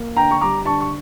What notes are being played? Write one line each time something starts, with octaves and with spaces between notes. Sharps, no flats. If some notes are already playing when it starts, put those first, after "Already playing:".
Already playing: A#3
D3 G5 A#5
C#6
G3 A#5 D6
D3 A5 C#6
C#6